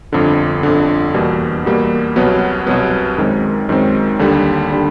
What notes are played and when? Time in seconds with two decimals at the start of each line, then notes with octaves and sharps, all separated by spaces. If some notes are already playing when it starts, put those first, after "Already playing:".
0.13 G1 F2 D3
0.63 G1 F2 D3
1.14 E2 B2 G3 A#3
1.65 E2 B2 G3 A#3
2.16 C2 B2 F#3 B3
2.67 C2 B2 F#3 B3
3.18 F#2 D#3 G#3 C4
3.69 F#2 D#3 G#3 C4
4.19 D#2 D3 G3
4.72 D3 G3